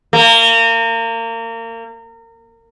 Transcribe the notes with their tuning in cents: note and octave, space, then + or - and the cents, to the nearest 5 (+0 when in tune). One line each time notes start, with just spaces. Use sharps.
A#3 -30